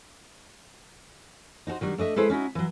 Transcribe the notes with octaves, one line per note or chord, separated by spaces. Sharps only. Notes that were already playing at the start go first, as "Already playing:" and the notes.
D#4 F#4 A4 C5
D#3 F#3 G3 D4
A3 D4 D#5 E5
G#3 E4 A4 B4 C5
C#4 D#4 E4 F#4
E3 F#3